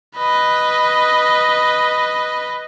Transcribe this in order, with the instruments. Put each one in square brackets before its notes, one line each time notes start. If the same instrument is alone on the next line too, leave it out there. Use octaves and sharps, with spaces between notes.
[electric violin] B4 D#5